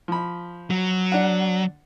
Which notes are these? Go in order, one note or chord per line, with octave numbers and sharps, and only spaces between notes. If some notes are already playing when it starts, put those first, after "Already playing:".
F3 B5
F#3
D4 F#5